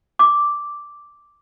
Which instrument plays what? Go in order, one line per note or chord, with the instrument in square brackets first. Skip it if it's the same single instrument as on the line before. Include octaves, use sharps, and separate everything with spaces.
[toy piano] D6